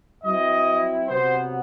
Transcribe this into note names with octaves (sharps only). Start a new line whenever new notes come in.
F#3 C4 E4 D#5
C3 F#3 B3 C5